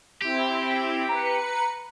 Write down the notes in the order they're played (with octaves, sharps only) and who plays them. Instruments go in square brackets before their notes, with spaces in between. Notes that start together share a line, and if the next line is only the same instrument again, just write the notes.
[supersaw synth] C4 E4 [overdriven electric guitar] G4
[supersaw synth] B4 C#7 [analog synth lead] A#5